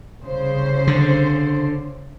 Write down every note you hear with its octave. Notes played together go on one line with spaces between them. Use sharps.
C2 C#3 C5
D3